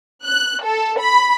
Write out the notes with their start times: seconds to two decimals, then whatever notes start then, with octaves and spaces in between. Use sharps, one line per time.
0.25 F#6
0.62 A4
0.99 B5